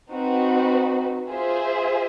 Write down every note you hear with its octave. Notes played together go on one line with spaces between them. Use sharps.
C4 D#4 F#4 B4
F4 G#4 C5 E5